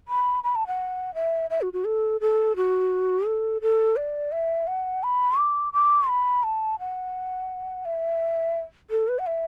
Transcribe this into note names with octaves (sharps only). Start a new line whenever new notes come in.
B5
B5
A5
F#5
E5
E5
F#4
F#4
A4
A4
F#4
A4
A4
D5
E5
F#5
B5
D6
D6
B5
A5
F#5
E5
A4
B4
F#5
E5